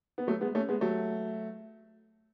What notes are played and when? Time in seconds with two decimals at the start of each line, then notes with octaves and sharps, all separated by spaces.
0.18 B3
0.27 F#3 A3
0.41 G#3 B3
0.55 A3 C#4
0.69 G#3 B3
0.81 F#3 A3